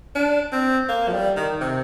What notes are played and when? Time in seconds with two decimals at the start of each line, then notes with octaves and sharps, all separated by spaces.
0.15 D4
0.52 C4
0.89 A#3
1.08 F3
1.13 G3
1.36 D#3
1.61 C3